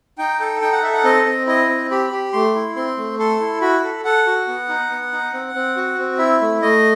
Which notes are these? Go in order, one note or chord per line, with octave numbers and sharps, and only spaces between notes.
D#4 G5
A4
D#4 G5
F#5
A4 E5
F#5
C4 D#5
C4
E4 D#5
C4
G4 B5
G4
A3 C6
E4
C4 C6
A3
A4 C6
E4
F#4 B5
A4
A4 F#5
F#4
B3
D#4
B3
D#4
C4
C4
F#4
C4
E4 E5
A3
A3 D#5